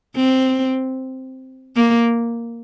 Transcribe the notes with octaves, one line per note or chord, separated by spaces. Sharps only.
C4
A#3